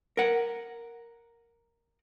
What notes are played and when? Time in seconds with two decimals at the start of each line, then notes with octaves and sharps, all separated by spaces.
0.17 A#4 F#5